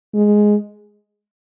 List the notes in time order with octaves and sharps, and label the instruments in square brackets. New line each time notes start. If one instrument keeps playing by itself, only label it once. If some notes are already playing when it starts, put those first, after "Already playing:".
[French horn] G#3